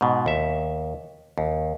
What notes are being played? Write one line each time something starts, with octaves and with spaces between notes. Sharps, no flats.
G#2 B2
D#2 E5
D#2